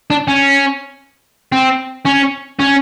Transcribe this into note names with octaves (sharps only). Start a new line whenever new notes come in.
D4
C#4
C4
C#4
C#4